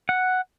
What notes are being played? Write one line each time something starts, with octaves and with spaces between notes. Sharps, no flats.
F#5